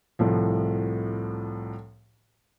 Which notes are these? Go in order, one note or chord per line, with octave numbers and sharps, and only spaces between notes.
C2 A2 F3